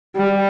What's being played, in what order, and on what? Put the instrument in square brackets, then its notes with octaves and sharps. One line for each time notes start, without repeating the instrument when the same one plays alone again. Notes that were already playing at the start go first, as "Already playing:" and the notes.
[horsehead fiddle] G3